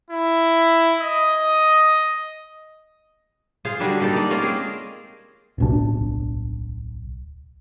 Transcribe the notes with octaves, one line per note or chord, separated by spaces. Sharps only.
E4
D#5
F4 G#4 C5 F5
D3 F#3 G3 D4
G3 A#3 D#4 A4
D#4 D5
A#3 C#4 F4 A#4
C4 G#4
D1 B1 D4